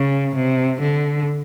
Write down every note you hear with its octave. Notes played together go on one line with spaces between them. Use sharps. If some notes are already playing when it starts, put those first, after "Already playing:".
Already playing: C#3
C3
D3